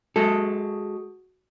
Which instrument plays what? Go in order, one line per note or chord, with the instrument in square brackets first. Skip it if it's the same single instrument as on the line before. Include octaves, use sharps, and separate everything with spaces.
[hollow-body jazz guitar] G#3 A4 [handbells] F#4 G#4